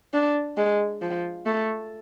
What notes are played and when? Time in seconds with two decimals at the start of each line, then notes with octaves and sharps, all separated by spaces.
0.14 D4
0.57 G#3
1.02 F3
1.46 A3